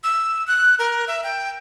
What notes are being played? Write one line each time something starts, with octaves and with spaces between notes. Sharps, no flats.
E6
F#6
A#4
E5
G5